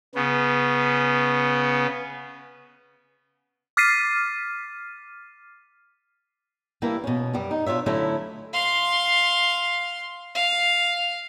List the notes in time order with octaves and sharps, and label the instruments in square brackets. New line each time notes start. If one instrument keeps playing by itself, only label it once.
[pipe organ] C#3 B3
[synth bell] D6 F6 A6 B6 C7 D#7
[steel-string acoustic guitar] E3 G3 A#3 D4 E4
B2 C#4
F#2 G3
D#4
B2 D4 F4 C#5 E5
D3 F#3 A3 C#4 E4
[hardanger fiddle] F5 C6
F5